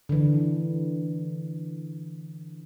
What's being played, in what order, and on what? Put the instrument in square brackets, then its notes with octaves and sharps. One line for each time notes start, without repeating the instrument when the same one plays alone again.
[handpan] D3 E3